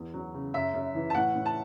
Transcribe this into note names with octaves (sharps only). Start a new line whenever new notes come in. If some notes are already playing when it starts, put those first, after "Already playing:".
Already playing: E2
F#3
C#3
F#2 E5
F#2
E3
A5
A2 F#5
A2
A5